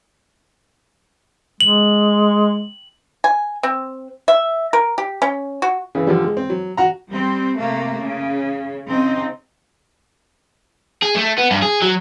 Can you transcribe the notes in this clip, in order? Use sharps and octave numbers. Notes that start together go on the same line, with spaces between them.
G#3 F#7
G#5
C4
E5
A#4
G4
C#4
F#4
C#3 E3
D3 F3 G3
G#3
C4
F#3
F#4 F#5 A#5
G3 C4
C3 A3 A#3
C#3
C#3 C4 D#4
G#4
A3
B3
G2
G#4
F#3